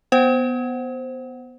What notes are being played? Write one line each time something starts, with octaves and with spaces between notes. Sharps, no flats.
B3 C5 F#5